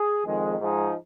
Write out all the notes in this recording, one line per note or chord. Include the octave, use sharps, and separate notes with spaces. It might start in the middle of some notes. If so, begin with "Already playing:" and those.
Already playing: G#4
F2 D#3 G#3
G#2 F3 G#3 D#4 G#4